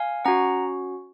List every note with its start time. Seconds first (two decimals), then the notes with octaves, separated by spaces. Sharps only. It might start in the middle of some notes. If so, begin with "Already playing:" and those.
Already playing: F5 G#5
0.25 C#4 F#4 F#5 A#5